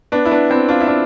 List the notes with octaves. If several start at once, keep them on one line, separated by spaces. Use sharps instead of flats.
B3 D4
E4
B3 D4
C4 E4
D4 F4
E4
D4 F4